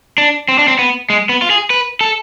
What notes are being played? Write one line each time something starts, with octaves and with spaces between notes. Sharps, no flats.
D4
C4
D4
C4
B3
G#3
B3
F4
G#4
B4
A4